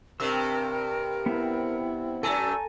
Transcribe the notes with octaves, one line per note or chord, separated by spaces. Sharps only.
G2 C3 C4 A#4 E6
B3 C4 E4
F#2 A3 A4 G#5 A#5 E6